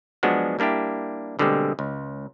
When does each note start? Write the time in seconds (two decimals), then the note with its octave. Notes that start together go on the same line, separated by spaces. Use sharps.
0.23 F3 F#3 G#3 B3 D4 F#4
0.59 G3 A#3 D4 E4 G4
1.39 B2 D3 G3 G#3 A#3 C4
1.79 C#2